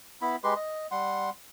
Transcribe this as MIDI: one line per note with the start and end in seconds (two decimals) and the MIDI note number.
0.22 0.36 59
0.22 0.36 64
0.22 0.36 83
0.44 0.54 56
0.44 0.54 67
0.44 0.54 71
0.44 0.54 84
0.56 0.87 75
0.91 1.30 55
0.91 1.30 78
0.91 1.30 84